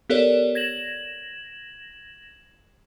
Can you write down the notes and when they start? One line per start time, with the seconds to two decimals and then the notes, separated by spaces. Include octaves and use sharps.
0.10 B3 G4 A4 A#4 C#5 D5
0.55 G#6 A#6 E7 F#7